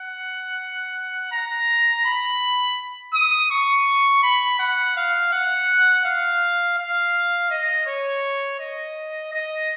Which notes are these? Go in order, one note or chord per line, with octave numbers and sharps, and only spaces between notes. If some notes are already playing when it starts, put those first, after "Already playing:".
Already playing: F#5
A#5
B5
D#6
C#6
B5
F#5
F5
F#5
F5
F5
D#5
C#5
D#5
D#5